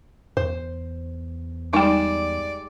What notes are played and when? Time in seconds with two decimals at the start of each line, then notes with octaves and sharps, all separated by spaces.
0.37 E2 C5
1.73 G3 G#3 D#4 D5 G5